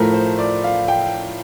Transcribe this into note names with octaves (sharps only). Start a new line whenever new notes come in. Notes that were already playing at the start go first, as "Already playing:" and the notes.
Already playing: A2 F3 A3 A#4
C5
D5
F5
G5